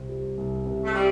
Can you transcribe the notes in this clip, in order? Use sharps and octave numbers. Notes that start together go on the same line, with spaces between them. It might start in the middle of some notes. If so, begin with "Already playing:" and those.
Already playing: C2 C3 C4
G3
C2
C3
A3
G3